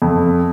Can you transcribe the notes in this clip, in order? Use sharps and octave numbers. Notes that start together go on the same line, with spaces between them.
F2